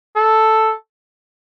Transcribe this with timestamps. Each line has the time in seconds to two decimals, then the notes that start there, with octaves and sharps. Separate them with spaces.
0.16 A4